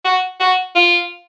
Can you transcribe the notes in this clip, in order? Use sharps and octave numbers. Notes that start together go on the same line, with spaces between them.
F#4
F#4
F4